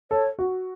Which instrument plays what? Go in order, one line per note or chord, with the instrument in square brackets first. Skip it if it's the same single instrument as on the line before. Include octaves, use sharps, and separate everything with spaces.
[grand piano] A4 [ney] C#5
[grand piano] F#4